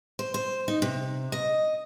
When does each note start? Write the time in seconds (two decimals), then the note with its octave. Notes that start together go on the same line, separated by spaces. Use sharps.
0.19 C5
0.34 C5
0.68 D#4
0.82 C3
1.32 D#5